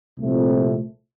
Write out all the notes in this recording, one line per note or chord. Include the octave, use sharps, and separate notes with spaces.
C2 A#2 F3 A3 C4